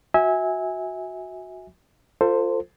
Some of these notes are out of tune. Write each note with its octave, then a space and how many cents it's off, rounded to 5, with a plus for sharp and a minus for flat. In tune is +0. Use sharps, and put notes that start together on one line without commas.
F#4 -10 E5 -25 G#5 -10
F4 +0 A4 +30 C5 +0